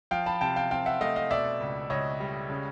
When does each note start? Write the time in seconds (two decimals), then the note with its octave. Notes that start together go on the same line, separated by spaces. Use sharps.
0.11 F3 F5 G5
0.26 A5 B5
0.41 C3 G5 A5
0.56 F5 G5
0.71 C4 F5 G5
0.86 E5 F#5
1.01 A3 D#5 F5
1.16 D#5 F5
1.31 B2 D5 E5
1.60 C#2
1.90 C#2 C#5 D#5
2.20 G3
2.50 C#3